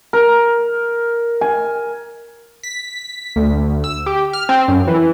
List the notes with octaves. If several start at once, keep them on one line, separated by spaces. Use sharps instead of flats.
A#4
G#5
B6
D2
E6
G4
F6
C4
F#2
E3